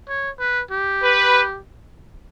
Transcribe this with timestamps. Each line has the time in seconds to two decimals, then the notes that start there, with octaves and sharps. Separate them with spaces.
0.08 C#5
0.40 B4
0.71 G4
1.03 B4